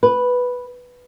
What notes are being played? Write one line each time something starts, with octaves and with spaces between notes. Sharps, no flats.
B4